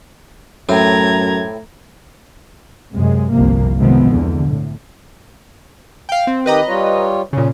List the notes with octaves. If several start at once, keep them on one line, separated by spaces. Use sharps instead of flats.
F#2 A2 A3 C4 A#5 G#6
F#2 C3 G#3
G1 C2 F2 C3 A#3
C3 D#3 F3 G#3 B3 C4
E2 D3
A2
F5 G5
C4
D#3 G4 B4 D#5 G5 A#5
G3 F4 C#5
A#2 C#3 C#4